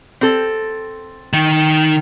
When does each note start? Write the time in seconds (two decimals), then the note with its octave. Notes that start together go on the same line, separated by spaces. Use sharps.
0.21 C4 A4
1.33 D#3